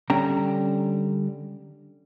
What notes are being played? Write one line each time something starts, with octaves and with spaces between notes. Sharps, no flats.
D3 G3 C#4 G5 A#5